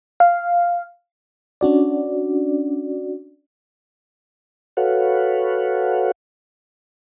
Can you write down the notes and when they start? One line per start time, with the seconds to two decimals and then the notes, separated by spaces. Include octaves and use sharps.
0.20 F5
1.61 C#4 D4 F#4 D5
4.77 F#4 A4 B4 C#5 F5 F#5